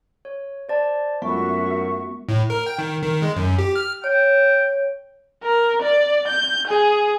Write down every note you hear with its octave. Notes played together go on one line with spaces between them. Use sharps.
C#5
C5 D5 A5
F#2 G#3 A3 B3 F4 F#4 E5 C#6
A2
A#4
G5
D#3
D#3
G#3
F#2
G4
F6
C#5 G5
A#4
D5
G6
G#4